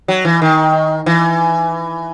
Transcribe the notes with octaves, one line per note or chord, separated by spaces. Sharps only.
F#3
E3
D#3
E3